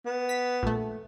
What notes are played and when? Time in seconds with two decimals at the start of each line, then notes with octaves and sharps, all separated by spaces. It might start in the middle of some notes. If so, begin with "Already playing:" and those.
0.06 B3
0.29 B6
0.63 A#1 A3